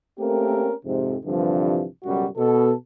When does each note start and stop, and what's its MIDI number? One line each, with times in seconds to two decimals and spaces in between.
0.18 0.72 57
0.18 0.72 58
0.18 0.72 60
0.18 0.72 61
0.18 0.72 67
0.18 0.72 70
0.84 1.16 41
0.84 1.16 44
0.84 1.16 48
1.24 1.86 36
1.24 1.86 43
1.24 1.86 50
1.24 1.86 52
1.24 1.86 53
2.04 2.26 37
2.04 2.26 42
2.04 2.26 47
2.04 2.26 55
2.04 2.26 66
2.37 2.73 47
2.37 2.73 69